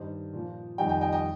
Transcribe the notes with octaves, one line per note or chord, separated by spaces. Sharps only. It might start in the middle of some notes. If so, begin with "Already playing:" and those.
Already playing: G2 D#3 G3 C5 D#5
A#2 F3
F2 D#3 G3 D#5 G5
D#5 G5
D#5 G5
D#5 G5